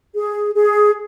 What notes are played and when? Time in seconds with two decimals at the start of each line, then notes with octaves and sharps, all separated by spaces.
0.14 G#4
0.54 G#4